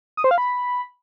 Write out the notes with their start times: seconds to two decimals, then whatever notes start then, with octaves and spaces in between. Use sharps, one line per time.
0.17 D#6
0.24 C5
0.31 F5
0.38 B5